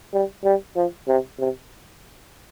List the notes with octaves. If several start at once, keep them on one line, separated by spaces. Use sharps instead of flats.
G3
G3
F3
C3
C3